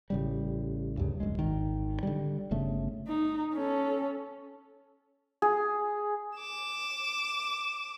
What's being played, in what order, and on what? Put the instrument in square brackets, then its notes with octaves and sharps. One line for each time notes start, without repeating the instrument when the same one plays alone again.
[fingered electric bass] A1 C#3 G3
D2 G2 C#3
D1 B1 F#2 G#3
G#1 D#3
D3 G3
G1 C#3 A3
[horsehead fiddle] D#4
C#4 A4
[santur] G#4
[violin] D6 E7